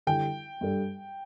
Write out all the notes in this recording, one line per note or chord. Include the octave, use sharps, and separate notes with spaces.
D3 G3 E4 A4 G5
G2 G3 D4 A4